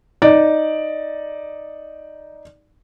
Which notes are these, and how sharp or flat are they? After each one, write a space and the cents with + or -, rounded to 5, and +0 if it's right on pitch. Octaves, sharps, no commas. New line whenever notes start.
D#4 +0 D5 +0